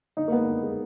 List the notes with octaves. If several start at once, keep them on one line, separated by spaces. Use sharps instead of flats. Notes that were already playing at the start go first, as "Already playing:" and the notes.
D3 D#4
A#3
G#3 B3
D3
G#3